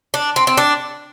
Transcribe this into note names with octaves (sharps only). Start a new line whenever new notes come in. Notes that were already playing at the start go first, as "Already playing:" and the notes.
D4
C4
C4
D4